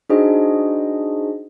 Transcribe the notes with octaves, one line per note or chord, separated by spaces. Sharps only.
D4 D#4 F#4 G#4 C5 D#5